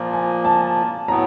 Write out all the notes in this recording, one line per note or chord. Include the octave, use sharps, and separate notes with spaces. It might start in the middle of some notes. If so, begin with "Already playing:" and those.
Already playing: A#2 F3 A#3 A5
G#5
A5
A2 F#3 B3 A#5